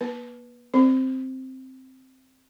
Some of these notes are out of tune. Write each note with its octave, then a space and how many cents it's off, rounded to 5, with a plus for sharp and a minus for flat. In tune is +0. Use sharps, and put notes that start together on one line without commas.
A#3 +40 B4 -10
C4 +0 C5 +0